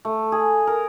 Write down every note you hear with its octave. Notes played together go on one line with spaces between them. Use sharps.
A3
G#4
A#4